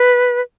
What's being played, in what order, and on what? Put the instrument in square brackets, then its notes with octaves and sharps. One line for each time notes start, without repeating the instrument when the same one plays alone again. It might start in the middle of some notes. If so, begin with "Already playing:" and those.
Already playing: [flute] B4